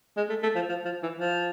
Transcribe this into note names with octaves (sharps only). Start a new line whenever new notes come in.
G#3
A3
A3
F3
F3
F3
E3
F3